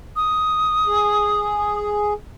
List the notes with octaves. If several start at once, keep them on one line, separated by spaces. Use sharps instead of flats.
D#6
G#4